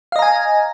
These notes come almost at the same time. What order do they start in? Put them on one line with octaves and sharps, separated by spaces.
F5 D#5 A#5 G#5